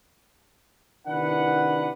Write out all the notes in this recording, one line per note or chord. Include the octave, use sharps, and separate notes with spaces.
C3 D#3 D4 E4 B4 F#5